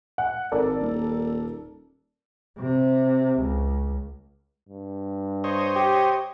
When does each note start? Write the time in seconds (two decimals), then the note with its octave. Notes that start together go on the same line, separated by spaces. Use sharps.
0.18 F#5
0.52 G#1 A4 A#4 D5
0.80 D#1
2.58 C3
3.39 C#2
4.69 G2
5.44 C5 C#5 D#5
5.76 G4